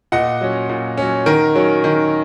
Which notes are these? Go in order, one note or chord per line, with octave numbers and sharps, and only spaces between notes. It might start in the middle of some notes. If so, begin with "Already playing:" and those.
A#2 D#5 F#5
F#3 C#4
A#2
F#3 C#4
D#3 A#4
F#3 C#4
D#3